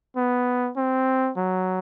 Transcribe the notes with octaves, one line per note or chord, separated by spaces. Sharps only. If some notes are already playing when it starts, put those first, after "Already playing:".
B3
C4
F#3